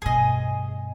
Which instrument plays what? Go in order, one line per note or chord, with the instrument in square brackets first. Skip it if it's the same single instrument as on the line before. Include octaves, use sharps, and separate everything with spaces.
[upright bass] G2 B2 [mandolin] G#4 D#5